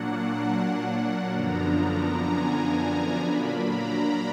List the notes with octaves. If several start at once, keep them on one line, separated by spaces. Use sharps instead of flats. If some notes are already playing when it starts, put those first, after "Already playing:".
Already playing: A#2 F#3 A#3 D4 F#5
F#2 D3 F3 B3 D4 A#5
G#5
A#5
A#2 F#3 A#3 D4 B5
A#5